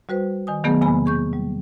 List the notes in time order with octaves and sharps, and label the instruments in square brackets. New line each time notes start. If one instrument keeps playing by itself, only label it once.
[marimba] G3 F#4 B4 C5
D#3 G#5 D#6
B2 D#3 F#3 A3 B3 G#4
E2 C3 A#3 G#5 B5
G#4 C#6 G6
G3